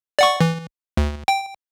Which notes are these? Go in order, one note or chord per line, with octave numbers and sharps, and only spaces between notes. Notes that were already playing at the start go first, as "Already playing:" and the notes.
D5 F#5 C#6
E3
D2
G5